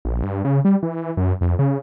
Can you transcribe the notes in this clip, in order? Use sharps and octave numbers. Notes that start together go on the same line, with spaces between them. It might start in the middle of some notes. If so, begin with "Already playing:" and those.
A#1
G2
C#3
G3
E3
F#2
F2
C#3